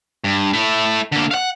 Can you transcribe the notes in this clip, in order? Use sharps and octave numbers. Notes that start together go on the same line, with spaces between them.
G2
A3 E4
D3 A#3
F5 F#5